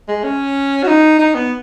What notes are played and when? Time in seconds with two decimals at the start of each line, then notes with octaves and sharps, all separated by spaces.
0.08 G#3
0.24 C#4
0.83 F#4
0.87 D#4
1.19 D#4
1.35 B3